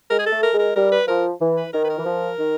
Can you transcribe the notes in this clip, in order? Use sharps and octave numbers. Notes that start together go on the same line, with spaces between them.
G#3 A#4
G#4
A3 A4
A#4
G#3
A#4
G3 A#4
B4
F3 A#4
E3
B4
D#3 A#4
B4
A#4
E3
F3
D#3